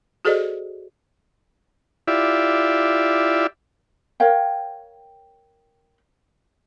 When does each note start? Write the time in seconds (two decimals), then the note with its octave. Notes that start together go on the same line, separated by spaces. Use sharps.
0.25 F#4 G#4 A4 C5 D5 D#5
2.08 E4 F4 G4 D5 E5
4.20 A#4 C#5 F5 G5